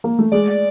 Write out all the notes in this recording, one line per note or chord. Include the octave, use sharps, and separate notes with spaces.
A#3
A3
G#3 D5